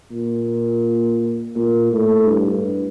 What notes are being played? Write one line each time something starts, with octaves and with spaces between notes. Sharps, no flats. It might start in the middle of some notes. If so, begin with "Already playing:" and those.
A#2
A#2
A2
G2